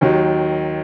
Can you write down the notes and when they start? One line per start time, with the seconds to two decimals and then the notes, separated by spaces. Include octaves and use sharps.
0.01 D#2 D#3 F#3